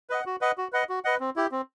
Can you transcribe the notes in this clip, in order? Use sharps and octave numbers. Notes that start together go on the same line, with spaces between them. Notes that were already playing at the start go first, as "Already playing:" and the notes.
B4 D#5 F#5
F#4
B4 D#5 F#5
F#4
B4 D#5 F#5
F#4
B4 D#5 F#5
C4
E4 G4
C4